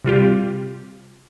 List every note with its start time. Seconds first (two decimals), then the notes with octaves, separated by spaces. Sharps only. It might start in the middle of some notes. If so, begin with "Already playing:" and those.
0.04 C3 G3 F4 G4